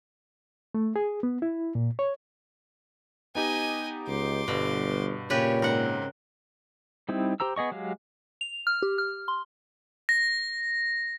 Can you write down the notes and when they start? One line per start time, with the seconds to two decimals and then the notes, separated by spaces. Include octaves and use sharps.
0.75 A3
0.96 G#4
1.23 B3
1.42 E4
1.75 A#2
1.99 C#5
3.35 B3 D#4 G4 D#5 G#5
4.07 C#2 C6 D6
4.48 G1 G2 B2
5.30 A#2 C#3 G4 B4 C#5
5.62 G#2 C4 A#4 F#5
7.09 G3 C4 D#4 E4
7.40 G4 C5 A#5 E6
7.56 B3 G#4 D#5 C#6
7.72 F#3 G#3 G4 F5
8.41 F7
8.67 F6
8.82 G4
8.98 F6
9.28 C6
10.09 A#6